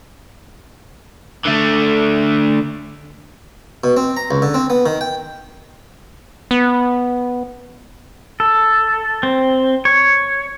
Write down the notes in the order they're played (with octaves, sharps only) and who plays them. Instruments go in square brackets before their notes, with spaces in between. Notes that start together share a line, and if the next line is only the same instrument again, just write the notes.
[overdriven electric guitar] D3 A3
[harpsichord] B2
C4
A#5
C#2
D3
C4
B3
D#3
G5
[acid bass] B3
[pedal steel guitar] A4
C4
C#5